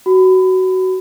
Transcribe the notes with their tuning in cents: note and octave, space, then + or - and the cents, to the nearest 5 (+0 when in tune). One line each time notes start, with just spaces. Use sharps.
F#4 +15 B5 +25